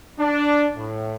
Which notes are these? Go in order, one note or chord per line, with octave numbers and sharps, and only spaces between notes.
D4
A2